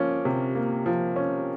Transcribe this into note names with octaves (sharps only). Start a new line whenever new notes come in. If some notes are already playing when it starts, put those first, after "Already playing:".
Already playing: F3 A#3 C#4
C3
A#3
F3
C#4